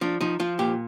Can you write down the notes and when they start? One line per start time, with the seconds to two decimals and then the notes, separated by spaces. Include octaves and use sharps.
0.01 F3 D4
0.21 F3 D#4
0.40 F3 F4
0.59 A#2 G4